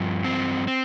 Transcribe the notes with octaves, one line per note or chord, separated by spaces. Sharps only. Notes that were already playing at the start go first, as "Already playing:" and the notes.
Already playing: G2 F3
C4
C4